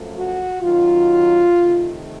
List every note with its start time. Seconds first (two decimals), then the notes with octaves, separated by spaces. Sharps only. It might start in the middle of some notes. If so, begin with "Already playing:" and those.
Already playing: F#2 F3 A3
0.13 F#4
0.62 F#2 D#3 F#3 F4
1.60 C3 D#3 A3